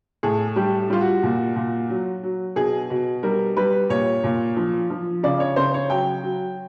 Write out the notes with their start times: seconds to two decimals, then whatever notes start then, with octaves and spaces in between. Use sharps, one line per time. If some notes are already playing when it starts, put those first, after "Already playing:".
0.23 A2 G#4
0.56 G3 G4
0.90 G3 F4
1.01 F#4
1.23 A#2
1.56 A#2
1.89 F#3
2.23 F#3
2.56 B2 G#4
2.90 B2
3.23 G3 A#4
3.57 G3 B4
3.89 A#2 C#5
4.24 A#2
4.57 F3
4.90 F3
5.23 C#3 D5
5.40 C#5
5.56 C#3 C5
5.74 C#5
5.90 F#3 G5
6.23 F#3